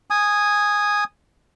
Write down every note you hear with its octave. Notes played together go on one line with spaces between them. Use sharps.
G#5 D#6